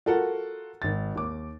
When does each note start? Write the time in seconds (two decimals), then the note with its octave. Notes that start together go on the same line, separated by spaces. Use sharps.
0.06 F4 F#4 A4 A#4 F#5
0.82 G#1 A6
1.15 D#2 D6